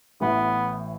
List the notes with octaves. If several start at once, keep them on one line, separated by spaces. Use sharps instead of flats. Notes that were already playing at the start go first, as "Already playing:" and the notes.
A1 A2 E3 B3